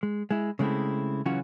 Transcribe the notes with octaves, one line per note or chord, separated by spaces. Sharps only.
G#3
G#3 E4
C#3 G#3 A3 C4 E4
C#3 E3 F#3 C#4 F4 F#4